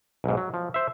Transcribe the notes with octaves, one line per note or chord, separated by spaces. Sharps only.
B1 G#2
F#3
F3
C5 E5